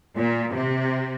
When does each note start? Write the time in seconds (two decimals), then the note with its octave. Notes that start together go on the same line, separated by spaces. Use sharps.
0.16 A#2
0.53 C3